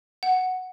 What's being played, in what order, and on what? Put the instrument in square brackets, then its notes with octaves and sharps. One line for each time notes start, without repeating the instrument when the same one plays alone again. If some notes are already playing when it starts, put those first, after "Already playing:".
[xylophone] F#5